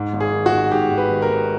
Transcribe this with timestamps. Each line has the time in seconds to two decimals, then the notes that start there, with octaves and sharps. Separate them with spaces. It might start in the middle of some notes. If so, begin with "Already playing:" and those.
Already playing: G#2
0.14 G#1
0.20 G#4
0.32 D#3
0.46 F#4
0.52 G#1
0.71 G#2 G4
0.91 G#1
0.98 B4
1.10 D#3
1.22 A#4
1.29 G#1